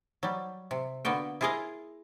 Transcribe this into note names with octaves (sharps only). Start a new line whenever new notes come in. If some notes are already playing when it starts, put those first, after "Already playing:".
F#3 G3
C3
D3 A#3 B3 F#4 G5
E4 F4 G#4 A#4 D#5 F5